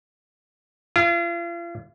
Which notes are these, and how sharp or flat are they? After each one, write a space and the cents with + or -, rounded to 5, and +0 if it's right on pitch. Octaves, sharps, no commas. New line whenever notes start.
F4 -40